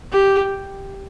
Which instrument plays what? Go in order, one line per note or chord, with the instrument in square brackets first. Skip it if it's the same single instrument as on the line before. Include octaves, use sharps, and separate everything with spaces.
[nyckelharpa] G4